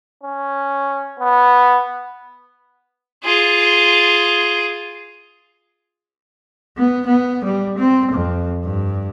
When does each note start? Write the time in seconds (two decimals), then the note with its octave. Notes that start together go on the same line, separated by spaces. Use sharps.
0.23 C#4
1.20 B3
3.24 F4 G#4
6.77 B3
7.07 B3
7.44 G3
7.78 C4
8.11 F2
8.64 G2